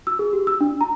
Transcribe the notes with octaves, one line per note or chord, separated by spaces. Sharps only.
E6
G#4
G4
E6
D4
A#5